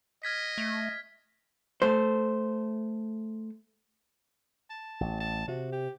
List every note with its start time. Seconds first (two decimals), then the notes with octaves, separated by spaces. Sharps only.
0.23 D#5 F6 G#6 B6
0.58 A3
1.82 A3 A4 C5
4.70 A5
5.01 A1
5.20 A5
5.48 C3 F#4
5.72 G4